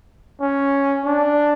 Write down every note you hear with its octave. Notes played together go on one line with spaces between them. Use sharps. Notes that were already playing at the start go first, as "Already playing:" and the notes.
C#4
D4